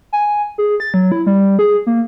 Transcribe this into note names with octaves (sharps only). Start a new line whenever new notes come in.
G#5
G#4
A6
F#3
E4
G3
G#4
A#3